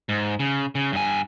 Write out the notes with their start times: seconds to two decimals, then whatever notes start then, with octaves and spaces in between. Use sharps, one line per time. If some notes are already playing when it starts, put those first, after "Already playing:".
0.09 G#2
0.40 C#3
0.75 C#3
0.92 G2 G#5